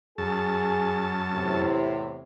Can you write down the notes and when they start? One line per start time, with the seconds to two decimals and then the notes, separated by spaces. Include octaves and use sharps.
0.18 F#2 G#4 A5
1.33 E2 A2 C3